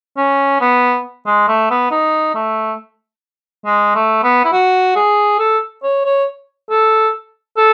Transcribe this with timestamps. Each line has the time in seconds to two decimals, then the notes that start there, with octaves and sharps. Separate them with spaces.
0.17 C#4
0.61 B3
1.26 G#3
1.48 A3
1.71 B3
1.91 D#4
2.35 A3
3.66 G#3
3.95 A3
4.23 B3
4.44 E4
4.53 F#4
4.96 G#4
5.39 A4
5.83 C#5
6.05 C#5
6.71 A4
7.57 A4